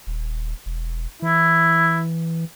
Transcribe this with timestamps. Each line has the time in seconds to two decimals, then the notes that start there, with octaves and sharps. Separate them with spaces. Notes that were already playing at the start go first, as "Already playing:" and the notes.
0.07 D#1
0.66 E1
1.22 E3 E4